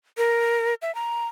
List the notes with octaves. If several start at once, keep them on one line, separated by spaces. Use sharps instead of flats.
A#4
E5
A#5